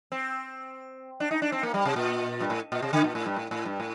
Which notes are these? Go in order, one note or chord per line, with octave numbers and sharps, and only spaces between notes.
C4
D4
D#4
D4
C4
A#3
G3
C3
A#2
G2
A2
A#2
C3
D3
A#2
A2
G2
A2
A2
G2
A2